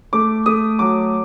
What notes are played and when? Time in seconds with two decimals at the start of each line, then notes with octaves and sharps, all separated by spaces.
0.13 A3 D6
0.46 A3 D#6
0.79 F#3 D6